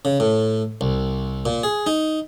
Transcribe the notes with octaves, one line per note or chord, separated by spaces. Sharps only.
C#3
A2
C2
A#2
G#4
D#4